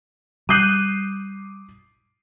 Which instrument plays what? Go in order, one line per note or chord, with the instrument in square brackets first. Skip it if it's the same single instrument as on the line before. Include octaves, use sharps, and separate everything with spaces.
[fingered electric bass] G3 [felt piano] D6 D#6 C7 [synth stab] F#6 G6 D#7